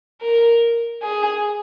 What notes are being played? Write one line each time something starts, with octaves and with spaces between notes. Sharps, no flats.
A#4
G#4